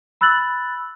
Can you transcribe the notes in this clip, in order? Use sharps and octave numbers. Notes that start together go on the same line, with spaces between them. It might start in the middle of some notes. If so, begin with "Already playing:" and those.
B5 E6 F#6 A6 F#7